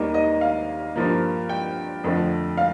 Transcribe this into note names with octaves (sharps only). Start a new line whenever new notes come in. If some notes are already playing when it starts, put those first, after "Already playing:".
Already playing: D#2 D#3 G3 A#3 D#5
D#5
F5
G2 F3 A#3
G5
F2 D3 F3 A3
F5